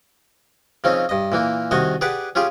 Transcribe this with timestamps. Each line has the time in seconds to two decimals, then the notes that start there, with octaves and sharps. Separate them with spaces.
0.84 C#3 F3 C4 C#4 D#4
1.09 G2 D#5
1.32 A#2 E3 A#3
1.71 C2 D#3 F#4 D#5 G#5
2.01 G4 G#4 B4 D5 F#5
2.35 C#4 F4 G4 G#4